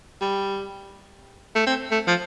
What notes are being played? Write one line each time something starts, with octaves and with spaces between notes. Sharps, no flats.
G3
A3
C4
A3
F3